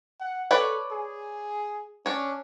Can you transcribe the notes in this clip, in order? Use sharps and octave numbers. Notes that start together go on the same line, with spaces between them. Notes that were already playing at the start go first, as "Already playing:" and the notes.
F#5
A4 B4 C#5 D5
G#4
C#4 D4 C#5